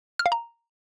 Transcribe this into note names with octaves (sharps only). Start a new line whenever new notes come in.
F6
F5
A#5